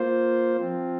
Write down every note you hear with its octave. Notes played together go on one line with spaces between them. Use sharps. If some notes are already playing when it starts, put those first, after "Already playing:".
Already playing: A#3 F4 C5
F3 C4 F4